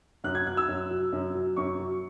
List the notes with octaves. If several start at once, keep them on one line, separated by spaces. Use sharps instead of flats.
F#2 F#6
G#6
F#3 F#6
E6
F#2
F#3
F#2
F#3
F#2 C#6
F#3